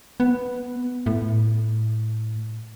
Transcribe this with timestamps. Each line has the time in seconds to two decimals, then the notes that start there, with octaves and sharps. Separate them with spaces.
0.20 B3
1.06 A2